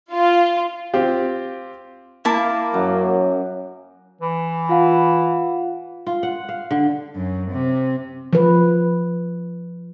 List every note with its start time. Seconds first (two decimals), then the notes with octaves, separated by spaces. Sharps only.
0.11 F4
0.94 C4 F4 G4
2.25 A#3 E4 A5 D6
2.74 F#2 F#3
4.21 E3
4.69 F4 F5 F#5
6.07 F4
6.23 F#5
6.49 F5
6.71 D3
7.15 F#2
7.52 C3
8.33 F3 B4